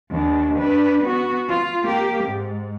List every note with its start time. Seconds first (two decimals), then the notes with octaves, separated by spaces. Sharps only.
0.11 D#2 D4
0.58 D4 B4
1.03 B3 F#4
1.49 F4
1.83 A#3 G4
2.24 G#2